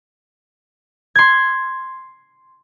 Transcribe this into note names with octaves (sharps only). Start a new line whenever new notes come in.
C6 G#6